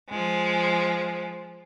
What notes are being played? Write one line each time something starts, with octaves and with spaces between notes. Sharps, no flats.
F3 G#3